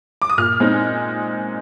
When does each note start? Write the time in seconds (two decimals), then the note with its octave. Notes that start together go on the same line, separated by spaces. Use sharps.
0.22 D6
0.30 D#6
0.38 A#2 F6
0.60 G#3 C4 D#4